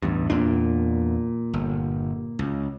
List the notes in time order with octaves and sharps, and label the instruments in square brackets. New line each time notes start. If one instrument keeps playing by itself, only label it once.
[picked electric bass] A1 E2 G2
[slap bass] E2 D4 [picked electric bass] A#2
[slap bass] G1
C#2